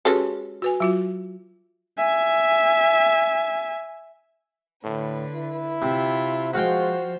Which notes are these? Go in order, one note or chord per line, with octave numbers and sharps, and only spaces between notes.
G#3 C#4 F#4 G4 A4 B4
F#4 B4 G#5
F#3 F4 F#4
E5 G#5
A2 D3 B4
E4
C3 F4
F3 G#3 F#4 C5 F5 G5